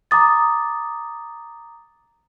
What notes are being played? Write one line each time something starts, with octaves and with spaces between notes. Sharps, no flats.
A#5 D6 D#6 A6